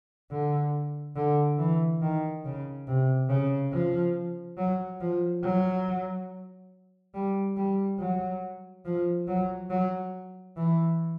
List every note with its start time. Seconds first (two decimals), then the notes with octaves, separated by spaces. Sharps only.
0.31 D3
1.16 D3
1.59 E3
2.02 D#3
2.45 C#3
2.88 C3
3.30 C#3
3.72 F3
4.58 F#3
5.01 F3
5.44 F#3
7.14 G3
7.57 G3
8.00 F#3
8.85 F3
9.28 F#3
9.70 F#3
10.56 E3